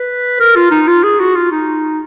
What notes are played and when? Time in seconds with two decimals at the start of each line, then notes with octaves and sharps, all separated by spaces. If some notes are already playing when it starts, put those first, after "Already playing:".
Already playing: B4
0.40 A#4
0.56 F4
0.71 D#4
0.88 F4
1.03 G#4
1.20 F#4
1.36 F4
1.51 D#4